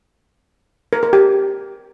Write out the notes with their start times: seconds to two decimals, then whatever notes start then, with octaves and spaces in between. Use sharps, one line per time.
0.93 A#4
1.03 A#4
1.13 G4